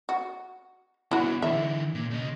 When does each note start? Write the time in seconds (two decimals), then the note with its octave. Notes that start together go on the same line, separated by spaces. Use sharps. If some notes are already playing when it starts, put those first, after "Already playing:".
0.09 F#4
1.11 B3 D4 E4 F#4
1.42 D3 E3 E5
1.95 A#2
2.11 C#3 D#5